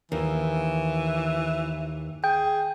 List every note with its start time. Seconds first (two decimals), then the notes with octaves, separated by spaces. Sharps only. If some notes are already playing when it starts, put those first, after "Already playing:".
0.12 D#2 E3
2.24 G#4 G5